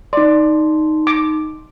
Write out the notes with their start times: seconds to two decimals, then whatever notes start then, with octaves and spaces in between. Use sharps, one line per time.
0.13 D#4 D5 C6
1.07 D6